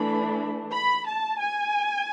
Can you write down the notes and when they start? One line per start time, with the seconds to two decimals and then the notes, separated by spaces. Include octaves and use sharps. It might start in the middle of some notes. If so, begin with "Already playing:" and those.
Already playing: E3 A3 D4 B5
0.73 B5
1.07 A5
1.40 G#5